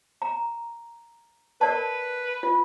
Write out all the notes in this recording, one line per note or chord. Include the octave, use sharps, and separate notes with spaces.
A#5
A#4 B4 D5 A5
F4